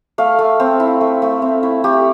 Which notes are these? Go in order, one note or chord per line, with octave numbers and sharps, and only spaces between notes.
A3 F5
A3
C4
E4
A3
A3
C4
E4
A3 G4